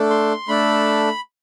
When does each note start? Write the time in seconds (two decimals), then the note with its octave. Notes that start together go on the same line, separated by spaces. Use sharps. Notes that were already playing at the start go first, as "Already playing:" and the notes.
Already playing: A3 D4 A4
0.10 C6
0.48 A3 D4 A4 B5